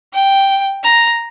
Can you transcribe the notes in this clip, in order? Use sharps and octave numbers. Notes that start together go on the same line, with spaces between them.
G5
A#5